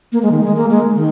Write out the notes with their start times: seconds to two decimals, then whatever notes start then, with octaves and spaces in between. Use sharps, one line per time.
0.12 A#3
0.22 G#3
0.32 D#3
0.44 G#3
0.57 A#3
0.70 G#3
0.95 D#3